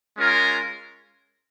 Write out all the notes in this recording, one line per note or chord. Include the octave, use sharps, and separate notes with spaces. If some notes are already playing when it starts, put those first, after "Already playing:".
G#3 C#4 F4 A#4